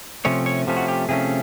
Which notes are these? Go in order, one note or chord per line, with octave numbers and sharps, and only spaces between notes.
C3 F3 A3 C#4 C#5
C#5
C3 F3 A3 C#4
F#4
G4
C3 F3 A3 C#4 G#4